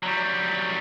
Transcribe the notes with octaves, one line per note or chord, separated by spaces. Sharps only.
F#3 G3